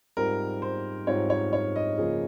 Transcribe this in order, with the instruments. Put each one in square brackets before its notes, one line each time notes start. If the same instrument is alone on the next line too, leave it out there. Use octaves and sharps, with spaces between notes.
[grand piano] G#2 G3 C4 F4 [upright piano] A#4
[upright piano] C5
[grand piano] G#2 G3 C4 F4 [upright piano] C#5
[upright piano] C#5
C#5
D#5
[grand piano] C#3 F3 A#3 F4 G#4